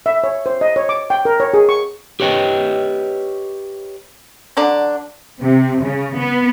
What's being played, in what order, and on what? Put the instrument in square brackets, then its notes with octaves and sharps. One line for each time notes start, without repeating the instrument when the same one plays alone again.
[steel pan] E5
C#5
C5
D#5
C#5
D6
G5
A#4
C#5
G#4
C#6
[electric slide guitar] G4 B4 C#5 D#5 G5
[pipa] D3 F#3 D4
[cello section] C3
C#3
B3